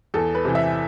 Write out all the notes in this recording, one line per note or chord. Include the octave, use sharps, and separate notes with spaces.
E2 A4
B4
C3 E3
E5